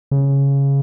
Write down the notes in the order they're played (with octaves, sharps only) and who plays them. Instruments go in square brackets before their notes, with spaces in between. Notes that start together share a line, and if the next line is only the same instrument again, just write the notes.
[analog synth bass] C#3